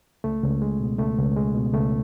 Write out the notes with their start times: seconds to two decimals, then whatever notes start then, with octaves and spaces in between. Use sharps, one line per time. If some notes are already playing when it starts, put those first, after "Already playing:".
0.24 C#2 A3
0.43 C#2
0.62 G#3
0.80 B2
0.99 C#2 A3
1.18 C#2
1.37 G#3
1.55 B2
1.74 C#2 A3